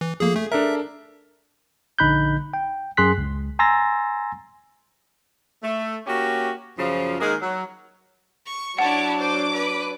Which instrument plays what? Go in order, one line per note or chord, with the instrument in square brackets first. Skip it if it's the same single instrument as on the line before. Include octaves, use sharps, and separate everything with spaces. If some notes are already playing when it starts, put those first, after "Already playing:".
[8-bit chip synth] E3
[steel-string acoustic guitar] F3 A3 [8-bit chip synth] A#3 G#4
[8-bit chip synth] A3 [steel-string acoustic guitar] G#4
[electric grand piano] D4 A4 A#4 [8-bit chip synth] E5
[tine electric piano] A#1 D3 D#4 B5 F#6 G6
G5
F#2 G#4 C6 F#6 B6
C#2
G#5 A#5 C6 E6 A6 A#6
[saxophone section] A3
A#3 C#4 F#4 G4
F#2 C#3 F3
D#3 G#3 A#3 G#4
F#3
[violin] C#6
[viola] F#3 D4 [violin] E4 C#5 [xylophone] F#5 [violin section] A5 D6
[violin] C5 [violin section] D6
[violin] B4